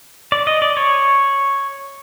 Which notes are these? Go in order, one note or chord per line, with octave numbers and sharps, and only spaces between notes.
D5
D#5
D5
C#5